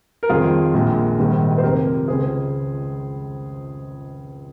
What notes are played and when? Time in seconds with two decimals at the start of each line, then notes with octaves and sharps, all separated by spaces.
0.23 A#4
0.29 F2 D#3 G3 F4 G#4
0.74 A#1 A#2 G#3
1.19 A#1 G#2 D#3 G3
1.58 C5
1.63 F1 F2 C3 G4 A#4
2.08 C#2 C#3 G#3 G#4 C5